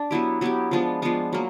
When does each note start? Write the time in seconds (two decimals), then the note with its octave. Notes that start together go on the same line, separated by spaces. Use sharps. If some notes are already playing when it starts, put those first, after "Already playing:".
Already playing: D4
0.11 F#3 B3 E4 G4
0.41 F#3 B3 E4 G4
0.71 F3 G#3 B3 D4
1.02 F3 G#3 B3 D4
1.33 F#3 A#3